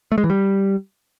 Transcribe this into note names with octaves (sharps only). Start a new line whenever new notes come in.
A3
G#3
E3
G3